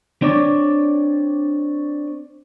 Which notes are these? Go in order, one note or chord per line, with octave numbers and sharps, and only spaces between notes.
C4 D4 C#5 D5